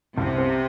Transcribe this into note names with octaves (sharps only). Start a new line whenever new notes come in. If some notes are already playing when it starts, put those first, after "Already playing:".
C2 C3
C4